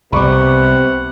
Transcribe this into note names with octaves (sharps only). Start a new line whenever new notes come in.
C2 C3 G3 B3 F#5 B5 C#6 D6